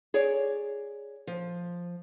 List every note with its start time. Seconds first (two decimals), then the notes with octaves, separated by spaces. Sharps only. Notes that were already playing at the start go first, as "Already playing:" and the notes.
0.14 G#4 C#5 D5
1.27 F3